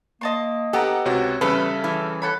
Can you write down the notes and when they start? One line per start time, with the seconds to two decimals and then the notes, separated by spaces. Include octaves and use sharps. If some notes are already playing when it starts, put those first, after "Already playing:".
0.21 A#3 D#5 A5 C6
0.73 B3 G4 A4 F#5 A#5
1.05 C#2 C3 F#4 C#5
1.41 E2 C#3 G3 C#4 A4 B4 E5
1.84 E3
2.22 A4 C#5 F#5 B5